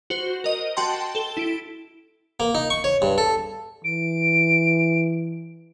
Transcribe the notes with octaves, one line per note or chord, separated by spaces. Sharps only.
F#4 C5
A#4 D#5
F#4 G5 A5 C6
A4 G7
E4 D7
A#3
D#4
C#6
C#5
G2
A4
E3 D7